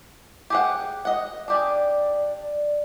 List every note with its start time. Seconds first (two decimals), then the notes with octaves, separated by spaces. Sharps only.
0.50 G4 G#4 F#5
1.05 D#5 F#5
1.48 D4 G4 G#4 D5